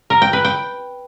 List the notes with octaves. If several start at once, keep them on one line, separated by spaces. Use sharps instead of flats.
A#4
G5
B4
G5